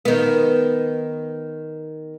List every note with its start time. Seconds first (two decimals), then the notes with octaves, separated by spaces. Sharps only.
0.05 D#3 B3